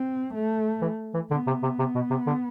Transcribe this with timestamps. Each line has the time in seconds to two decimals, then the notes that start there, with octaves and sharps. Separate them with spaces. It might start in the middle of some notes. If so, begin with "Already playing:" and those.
Already playing: C4
0.34 A3
0.82 E3
1.14 E3
1.30 D3 B3
1.47 C3
1.63 C3
1.79 C3
1.95 B2
2.10 C3
2.27 D3